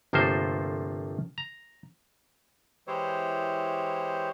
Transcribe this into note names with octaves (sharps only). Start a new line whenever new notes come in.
G1 C3 F3 A3 A#3 C5
A#5
E3 G#3 E4 G4 C5 C#5